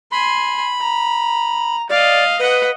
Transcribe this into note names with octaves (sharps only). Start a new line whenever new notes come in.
G#5 B5 C6
A#5
D5 D#5 F5
B4 D#5 F#5